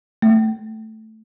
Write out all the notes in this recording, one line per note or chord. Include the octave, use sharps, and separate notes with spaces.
A3